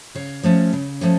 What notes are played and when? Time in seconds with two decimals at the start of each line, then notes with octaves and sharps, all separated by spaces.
0.15 C#3 C#5 F5
0.43 F3 A3 C#4
0.73 C#3
1.01 F3 A3 C#4